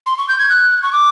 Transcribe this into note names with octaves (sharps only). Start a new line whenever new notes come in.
C6
C#6
G6
G#6
F#6
C#6
D6